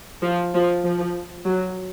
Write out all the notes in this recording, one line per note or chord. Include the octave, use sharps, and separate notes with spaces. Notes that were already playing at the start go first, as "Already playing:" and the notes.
F3
F3
F3
F#3